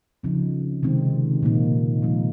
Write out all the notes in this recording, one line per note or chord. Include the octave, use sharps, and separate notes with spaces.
C#3 F3 C4 D#4
C3 D#3 G#3 C4 D#4
A#2 F3 A#3 D#4
F3 G#3 D#4